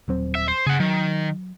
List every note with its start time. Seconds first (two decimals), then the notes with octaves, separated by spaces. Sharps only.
0.08 D#1 F#3 C4
0.35 E5
0.48 C5
0.66 C#3 G#4 F#5
0.80 D#3 F#3